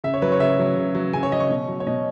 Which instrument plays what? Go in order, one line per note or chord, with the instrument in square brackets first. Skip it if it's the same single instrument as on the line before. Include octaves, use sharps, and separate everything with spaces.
[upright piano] C#3 E5
C#5
F#3 B4
C#5
C#3 E5
F#3
C#3
F#3
C#3 G#5
C#5
F#3 D#5
C#6
B2
F#3
C#5
B2 D#5